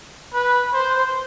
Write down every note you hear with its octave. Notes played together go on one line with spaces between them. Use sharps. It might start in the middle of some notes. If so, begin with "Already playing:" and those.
B4
C5